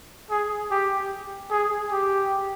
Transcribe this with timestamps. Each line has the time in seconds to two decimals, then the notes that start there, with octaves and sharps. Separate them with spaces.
0.30 G#4
0.71 G4
1.50 G#4
1.91 G4